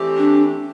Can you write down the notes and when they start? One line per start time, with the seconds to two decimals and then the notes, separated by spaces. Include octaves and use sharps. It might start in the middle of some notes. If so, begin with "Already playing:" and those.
Already playing: E3 A3 C4 G4 D5
0.17 D4